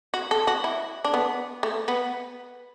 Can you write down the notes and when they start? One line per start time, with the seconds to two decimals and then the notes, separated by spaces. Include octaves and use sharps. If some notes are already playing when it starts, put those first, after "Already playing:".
0.14 F#4
0.31 A4
0.47 F#4
0.64 E4
1.05 D4
1.14 B3
1.63 A3
1.88 B3